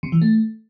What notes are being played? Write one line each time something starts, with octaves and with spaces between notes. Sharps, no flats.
C3
E3
A3